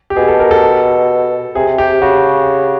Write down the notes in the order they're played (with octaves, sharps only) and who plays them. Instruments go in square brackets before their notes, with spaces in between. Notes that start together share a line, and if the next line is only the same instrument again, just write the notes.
[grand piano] G4
[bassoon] B2 [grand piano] G#4
[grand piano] A4
A#4
A4
[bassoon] C3 [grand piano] G#4
[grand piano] G4
[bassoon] C#3 [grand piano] F#4